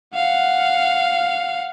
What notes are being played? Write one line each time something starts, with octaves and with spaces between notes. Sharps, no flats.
F5 F#5